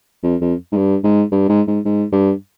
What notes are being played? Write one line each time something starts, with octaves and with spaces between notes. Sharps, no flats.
F2
F2
G#2
G2
G#2
G2
G#2
G#2
G#2
G2